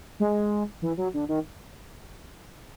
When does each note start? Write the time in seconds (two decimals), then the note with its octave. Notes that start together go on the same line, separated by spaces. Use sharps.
0.20 G#3
0.82 E3
0.97 F#3
1.14 D3
1.29 D#3